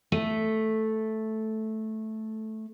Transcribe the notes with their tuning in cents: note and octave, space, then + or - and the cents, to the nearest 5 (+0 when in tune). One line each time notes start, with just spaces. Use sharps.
A3 -5